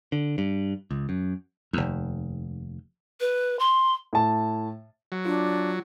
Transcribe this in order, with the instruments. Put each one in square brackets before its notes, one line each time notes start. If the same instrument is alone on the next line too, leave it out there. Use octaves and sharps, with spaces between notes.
[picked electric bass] D3
G2
C#2
F#2
[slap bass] F1 D#2
[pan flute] B4
C6
[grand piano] A2 A5
[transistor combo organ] F#3
[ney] D4 [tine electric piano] F4